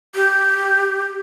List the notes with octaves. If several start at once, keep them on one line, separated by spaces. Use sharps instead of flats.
G4